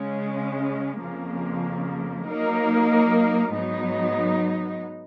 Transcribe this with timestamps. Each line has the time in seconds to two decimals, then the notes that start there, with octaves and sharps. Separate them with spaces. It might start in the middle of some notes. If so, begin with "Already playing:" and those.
Already playing: C#3 G#3 C#4
1.01 F2 C#3 F3 A#3
2.28 F#3 A#3 D#4 A#4
3.54 G#2 F#3 B3 D#4